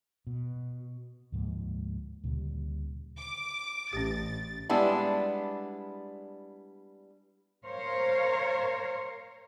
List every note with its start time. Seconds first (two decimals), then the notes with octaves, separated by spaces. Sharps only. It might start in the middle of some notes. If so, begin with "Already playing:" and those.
0.27 B2
1.32 D2 G#2 F3 A#3
2.24 D2 A#2 C#3 G3
3.18 D6
3.93 A1 C#4 G4 A6
4.69 G3 G#3 B3 D4 E4
7.64 A#4 C5 C#5 F5